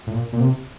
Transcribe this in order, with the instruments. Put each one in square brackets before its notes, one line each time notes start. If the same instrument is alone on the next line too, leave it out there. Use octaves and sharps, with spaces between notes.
[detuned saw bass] A2
A#2
A#2
C3